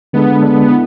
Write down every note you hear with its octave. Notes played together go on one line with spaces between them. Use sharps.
D3 G#3 B3 D4 A4
D3 G#3 D4 A4
E4